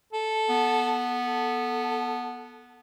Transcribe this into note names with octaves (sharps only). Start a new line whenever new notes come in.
A4
B3
A4